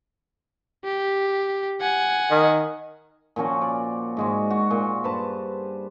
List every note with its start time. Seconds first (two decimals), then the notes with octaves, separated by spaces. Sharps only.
0.85 G4
1.81 F#5 G#5
2.31 D#3
3.36 A#2 F3 C#4 F#4
3.62 D5
4.17 G#2 G#3 F#4
4.50 F#4
4.71 A#2
5.04 G2 B4 C5 A5